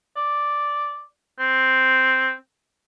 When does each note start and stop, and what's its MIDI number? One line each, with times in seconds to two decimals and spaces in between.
0.16 1.03 74
1.39 2.33 60